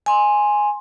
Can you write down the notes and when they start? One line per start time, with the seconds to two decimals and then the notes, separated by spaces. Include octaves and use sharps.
0.06 G#5 C6